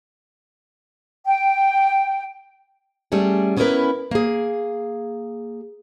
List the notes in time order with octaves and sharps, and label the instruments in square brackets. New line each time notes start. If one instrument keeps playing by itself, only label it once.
[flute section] G5
[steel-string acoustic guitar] G3 A3 C#4 G#4
B3 C#4 E4 G#4 A#4 B4
A#3 G#4